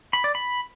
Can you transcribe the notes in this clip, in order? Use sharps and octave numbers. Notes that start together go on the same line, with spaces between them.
B5
D5
B5